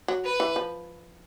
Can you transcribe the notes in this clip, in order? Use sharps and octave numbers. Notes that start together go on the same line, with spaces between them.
F#3
B4
E3
F3